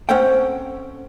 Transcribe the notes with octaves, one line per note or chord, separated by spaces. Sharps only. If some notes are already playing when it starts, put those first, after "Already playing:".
C4 C#4 A4 C5 F#5 G5